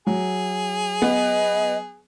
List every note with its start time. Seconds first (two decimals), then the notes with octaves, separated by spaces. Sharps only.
0.07 F#3 G#4
1.02 B3 D#5